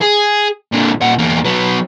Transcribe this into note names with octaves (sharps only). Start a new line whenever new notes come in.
G#4
A#2 D3
A#2 F#5
E2 A#3
F#3 B3